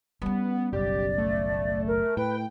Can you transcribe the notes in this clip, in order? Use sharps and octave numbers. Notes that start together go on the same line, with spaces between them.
G3 B3 C#4
F#1 B1 G4 D5
A3
A#4
A2 B4 G5